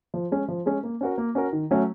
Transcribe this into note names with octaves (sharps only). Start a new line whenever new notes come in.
F3
G#3 C#4
F3
G#3 C#4
A#3
C#4 F#4 A#4
A#3
C#4 F#4 A#4
D#3
F#3 A3 C#4